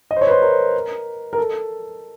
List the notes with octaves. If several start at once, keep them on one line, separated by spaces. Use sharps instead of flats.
D#5
C5
C#5
B4
C5
A#4
A#4
A4